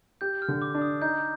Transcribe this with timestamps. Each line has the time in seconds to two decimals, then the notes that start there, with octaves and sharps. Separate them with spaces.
0.21 G4 G6
0.42 F6
0.48 D3
0.62 D6
0.75 D4
0.82 D#6
1.02 D#4 G6